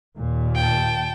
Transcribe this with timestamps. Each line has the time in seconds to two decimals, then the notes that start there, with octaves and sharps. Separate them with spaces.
0.17 D#2 A#2
0.56 G5 A5